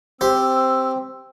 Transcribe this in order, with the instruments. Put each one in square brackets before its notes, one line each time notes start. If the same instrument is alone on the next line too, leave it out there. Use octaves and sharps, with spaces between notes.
[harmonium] C4 [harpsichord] G4 C5 [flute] E6